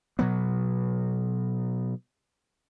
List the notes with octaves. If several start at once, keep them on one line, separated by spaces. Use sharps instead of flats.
B2 F#3 B3